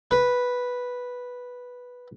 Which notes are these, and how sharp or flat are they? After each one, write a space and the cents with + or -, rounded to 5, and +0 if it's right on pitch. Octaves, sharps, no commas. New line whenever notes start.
B4 -5